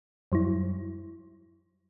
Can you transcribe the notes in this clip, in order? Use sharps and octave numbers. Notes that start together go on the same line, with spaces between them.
F#2 F#3 G3 E4